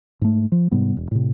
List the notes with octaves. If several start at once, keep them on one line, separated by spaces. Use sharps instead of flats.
G#2 A3
F3
G#2 C3 G3 B3
E1
A2 C3